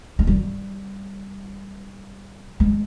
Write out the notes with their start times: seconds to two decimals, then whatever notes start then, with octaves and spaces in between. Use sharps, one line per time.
0.19 G#3
0.27 G3
2.60 G#3